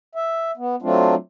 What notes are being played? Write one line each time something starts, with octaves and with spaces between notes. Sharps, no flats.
E5
B3
F#3 A3 C4 D4 F4